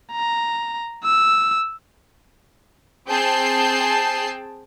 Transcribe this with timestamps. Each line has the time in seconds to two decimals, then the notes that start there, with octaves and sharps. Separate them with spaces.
0.12 A#5
1.04 E6
3.08 C4 G#4 G5 A5 G6 C7